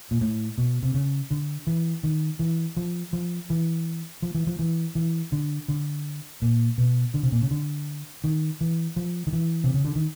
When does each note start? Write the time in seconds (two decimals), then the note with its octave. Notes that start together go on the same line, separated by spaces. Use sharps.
0.11 A#2
0.21 A2
0.58 B2
0.83 C3
0.94 C#3
1.31 D3
1.67 E3
2.03 D#3
2.39 E3
2.77 F3
3.13 F3
3.50 E3
4.22 F3
4.35 E3
4.47 F3
4.59 E3
4.95 E3
5.32 D3
5.68 D3
6.42 A#2
6.78 B2
7.14 D3
7.23 C3
7.32 A#2
7.42 C#3
7.51 D3
8.24 D#3
8.61 E3
8.96 F3
9.27 D#3
9.33 E3
9.64 C3
9.74 C#3
9.85 D3
9.96 D#3